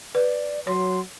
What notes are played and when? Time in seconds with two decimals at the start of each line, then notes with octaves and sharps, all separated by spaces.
0.15 B4 D5
0.67 F#3 C#5 C6